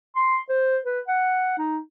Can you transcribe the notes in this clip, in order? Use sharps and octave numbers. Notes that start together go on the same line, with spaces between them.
C6
C5
B4
F#5
D#4